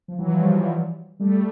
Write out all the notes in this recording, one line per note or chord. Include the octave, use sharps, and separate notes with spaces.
F3
E3 F#3
F3
F3 G3
G3 A3